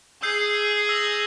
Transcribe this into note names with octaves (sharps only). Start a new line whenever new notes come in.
G#4 E6 G6 C7
E6 A#6 F7